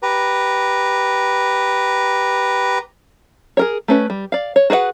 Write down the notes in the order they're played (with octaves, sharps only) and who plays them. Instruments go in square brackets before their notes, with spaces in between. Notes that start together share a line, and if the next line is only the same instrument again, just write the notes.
[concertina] G4 B4 A#5
[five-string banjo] G#4 A#4 C#5
A3 C#4 B4
G3
D5 F5
C#5
F#4 G#4 B4 E5 F#5